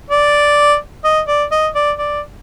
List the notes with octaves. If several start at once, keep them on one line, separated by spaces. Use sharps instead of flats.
D5
D#5
D5
D#5
D5
D5